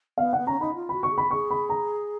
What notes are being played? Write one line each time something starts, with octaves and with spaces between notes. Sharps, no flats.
B3 F5
F#5
B3
C#4 A#5
D#4 B5
F4
F#4 B5
C#6
G#4
B5
G#4 C#6
B5
A#5